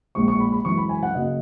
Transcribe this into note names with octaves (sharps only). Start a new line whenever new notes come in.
A#1 A#2 G#3 C#6
C#6
B5
B5
F#2 E3 G#3 C#6
B5
G#5
F#5
F#2 C#3 F#3 A#3 D#5